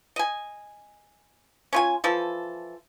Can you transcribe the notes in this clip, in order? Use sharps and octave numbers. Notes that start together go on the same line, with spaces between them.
D#5 G#5
C#4 F4 G#5
E3 F3 A4